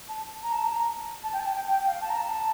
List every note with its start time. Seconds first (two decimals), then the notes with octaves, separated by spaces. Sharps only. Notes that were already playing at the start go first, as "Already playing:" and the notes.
0.09 A5
0.43 A#5
0.52 A5
0.63 A#5
1.24 A5
1.33 G5
1.40 A5
1.55 G5
1.70 G5
1.86 F5
2.02 A5
2.10 A#5
2.17 A5